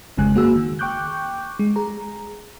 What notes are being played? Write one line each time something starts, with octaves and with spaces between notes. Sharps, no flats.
G1 F2 C#3 G#3 G#5 F#6
A#3 F#4 G#4 E6
D#3
G5 C#6 D6 F#6 G6
G#3
G#4 A#5